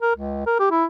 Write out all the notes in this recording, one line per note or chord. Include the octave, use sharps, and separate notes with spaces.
A#4
C#2
A#4
G4
E4